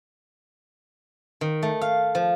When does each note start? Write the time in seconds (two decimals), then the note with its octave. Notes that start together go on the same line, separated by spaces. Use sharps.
1.41 D#3
1.63 A3
1.82 F5
2.15 F3